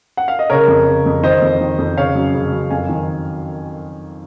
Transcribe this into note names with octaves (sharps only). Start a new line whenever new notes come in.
F#5
F5
D#5
C#3 A#4 C#5
F2
C#3
F2
D#3 C5 D#5
F2
D#3
F2
C#3 C#5 F5
F#2
C#3
F#2
F2 F5 G#5
D#3